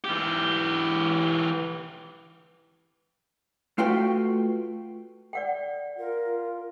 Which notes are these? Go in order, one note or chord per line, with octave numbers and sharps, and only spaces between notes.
E3 G4
A3 F4 F#4 B4 G5
D5 F#5 G5
F4 A#4